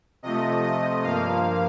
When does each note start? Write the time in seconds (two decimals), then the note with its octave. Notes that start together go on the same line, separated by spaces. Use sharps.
0.23 C3 F3 A3 D#5
0.63 D#5
1.03 G2 F3 A#3 F5